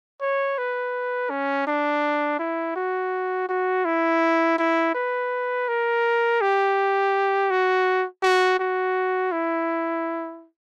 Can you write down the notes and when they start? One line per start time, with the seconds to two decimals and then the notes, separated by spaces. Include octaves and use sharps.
0.21 C#5
0.58 B4
1.30 C#4
1.67 D4
2.39 E4
2.76 F#4
3.49 F#4
3.85 E4
4.59 E4
4.95 B4
5.68 A#4
6.41 G4
7.50 F#4
8.23 F#4
8.59 F#4
9.32 E4